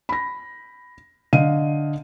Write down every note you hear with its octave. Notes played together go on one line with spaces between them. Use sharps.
B5 A#6
D3 D#5 F5 D#7